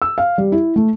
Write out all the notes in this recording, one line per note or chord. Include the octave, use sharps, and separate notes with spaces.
E6
F5
G3
E4
A3